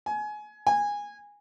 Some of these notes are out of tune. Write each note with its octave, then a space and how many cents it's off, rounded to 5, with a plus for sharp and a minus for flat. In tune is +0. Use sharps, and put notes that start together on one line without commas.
G#5 +25
G#5 -15